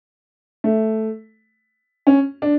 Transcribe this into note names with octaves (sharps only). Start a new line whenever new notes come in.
A3
C#4
D4